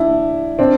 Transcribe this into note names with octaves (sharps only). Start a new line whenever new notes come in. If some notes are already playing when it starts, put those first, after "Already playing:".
Already playing: D4 E4
C4 D4